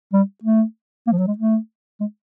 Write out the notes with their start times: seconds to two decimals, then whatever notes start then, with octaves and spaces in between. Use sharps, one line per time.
0.13 G3
0.44 A3
1.07 A#3
1.12 F3
1.18 F#3
1.27 G#3
1.38 A3
2.01 G#3